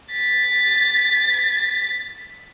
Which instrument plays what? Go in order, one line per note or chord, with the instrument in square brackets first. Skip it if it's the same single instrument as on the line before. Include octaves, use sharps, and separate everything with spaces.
[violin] A6 B6